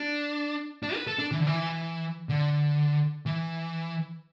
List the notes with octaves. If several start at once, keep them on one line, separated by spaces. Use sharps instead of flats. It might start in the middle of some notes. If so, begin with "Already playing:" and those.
Already playing: D4
D4
B4
A4
D4
E3
D3
E3
D3
E3